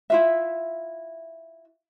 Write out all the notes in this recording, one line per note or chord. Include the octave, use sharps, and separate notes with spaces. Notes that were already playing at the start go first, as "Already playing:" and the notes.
E4 F4 E5